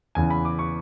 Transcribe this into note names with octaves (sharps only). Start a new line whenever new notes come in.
E2 C#3 E3 G#5
B5
D6
C#6